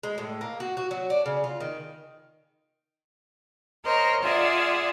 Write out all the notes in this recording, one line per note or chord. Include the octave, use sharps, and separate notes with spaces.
G#3
A2
A#3
F#4
F#4
F#3
D4
C#3
F4
D#3
A#4 C5 C#5 D#5 A#5
F4 G#4 D5 E5 F#5